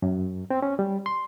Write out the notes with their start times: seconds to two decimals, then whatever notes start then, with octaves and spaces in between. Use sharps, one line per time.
0.02 F#2
0.50 C4
0.62 C#4
0.79 G3
1.06 C6